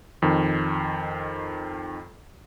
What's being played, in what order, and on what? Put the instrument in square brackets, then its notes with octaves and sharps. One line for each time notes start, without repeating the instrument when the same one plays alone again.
[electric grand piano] F2 D#3